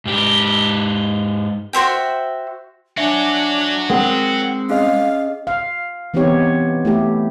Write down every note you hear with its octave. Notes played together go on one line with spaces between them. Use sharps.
G#2 G4
F#4 C5 E5 G5
D4 F#4 C#5 E5 G#5
G#3 C4 A#4 F#5 G5
C#4 G#4 D#5 F5
F5
E3 B3 C4 D#4 G4 C#5
A3 E4 G4